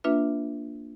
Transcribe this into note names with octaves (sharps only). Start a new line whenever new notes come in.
A#3 D4 F4 B4 E5